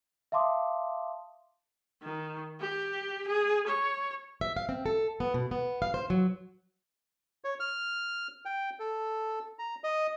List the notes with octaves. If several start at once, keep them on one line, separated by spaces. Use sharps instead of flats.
E5 F5 A5 C6 D6 D#6
D#3
G4
G#4
C#5
E5
F5
C4
A4
B3
B2
B3
F5
C5
F#3
C#5
F6
G5
A4
A#5
D#5